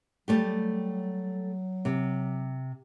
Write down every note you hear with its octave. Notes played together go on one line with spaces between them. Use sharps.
F#3 G3 A3 G4
C3